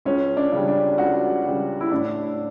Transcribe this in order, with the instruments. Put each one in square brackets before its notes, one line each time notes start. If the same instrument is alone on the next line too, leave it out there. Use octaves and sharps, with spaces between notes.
[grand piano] C#2 C#4
D4
C#3 G3
D4
C#2 F#4
C#3 G3
E4
A2 D4